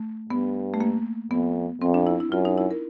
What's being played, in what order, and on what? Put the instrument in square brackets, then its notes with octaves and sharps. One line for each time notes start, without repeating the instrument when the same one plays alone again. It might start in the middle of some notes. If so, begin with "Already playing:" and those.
Already playing: [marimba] A3
[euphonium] G2 [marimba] B3
[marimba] A3
A#3
[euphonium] F2 [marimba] B3
[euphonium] F2 [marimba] C4
[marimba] D4
E4
E4
[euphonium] F#2 [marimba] F4
[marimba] D#4
E4
A#4